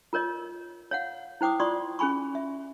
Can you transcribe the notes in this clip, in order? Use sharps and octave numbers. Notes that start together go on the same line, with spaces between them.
F4 A#4 C#5 D#5
C#5 F5 F#5
E4 C5 G5 D6 D#6
F4 D5 C6 C#6 D#6
C#4 G#4 G#5 B5 C#6
E5